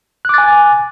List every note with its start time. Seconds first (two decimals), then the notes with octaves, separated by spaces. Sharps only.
0.25 F#6
0.29 D6
0.34 A6
0.38 G#5